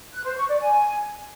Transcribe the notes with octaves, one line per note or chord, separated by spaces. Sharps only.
F#6
C5
C#6
D5
G#5